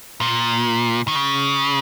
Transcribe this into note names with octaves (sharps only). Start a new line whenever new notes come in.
A#2
D#3
C#3